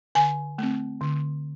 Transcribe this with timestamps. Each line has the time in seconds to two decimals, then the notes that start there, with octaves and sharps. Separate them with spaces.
0.15 D3 G#5
0.58 A3 C4
1.01 D3